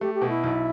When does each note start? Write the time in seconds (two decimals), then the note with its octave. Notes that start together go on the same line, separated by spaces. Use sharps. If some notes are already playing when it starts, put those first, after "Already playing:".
0.01 A3 G4
0.15 G4
0.21 B2
0.29 E4 E5
0.44 B1